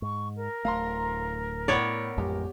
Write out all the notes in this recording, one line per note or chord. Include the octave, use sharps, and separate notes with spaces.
G#2 C#6
A#4
D1 A3 F5 A#5 C6
A2 B3 C#5 D5
A1 F2 G#3 G4